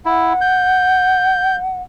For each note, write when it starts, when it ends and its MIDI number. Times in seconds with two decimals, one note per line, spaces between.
0.06 0.33 64
0.06 1.82 78
0.41 1.56 91